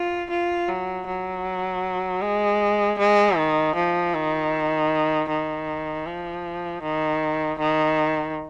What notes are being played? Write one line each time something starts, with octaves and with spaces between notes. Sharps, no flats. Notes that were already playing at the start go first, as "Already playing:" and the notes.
Already playing: F4
F4
F#3
F#3
G#3
G#3
D#3
F3
D#3
D#3
F3
D#3
D#3